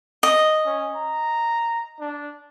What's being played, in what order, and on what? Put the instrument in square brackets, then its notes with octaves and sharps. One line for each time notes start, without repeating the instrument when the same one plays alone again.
[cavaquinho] D#5
[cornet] C#4
A#5
D4